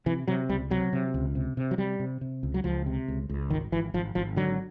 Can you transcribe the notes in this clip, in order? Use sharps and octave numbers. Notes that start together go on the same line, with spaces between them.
C3 E3
C3 F#3
C#2 G3
C3 F#3
C3
C#2
C3
C3
F#3
C3 G3
C3
C3
C#2
F#3
C#2 F3
C3
C#2
C#2
G#1 D#3
G#1 E3
G#1 F3
G#1 F3
D3 F#3